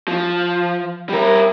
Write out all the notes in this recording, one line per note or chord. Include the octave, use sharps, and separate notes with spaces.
F3
G3 A#4